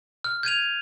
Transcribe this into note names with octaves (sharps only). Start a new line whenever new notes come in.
F6
G6 G#6 D#7 F7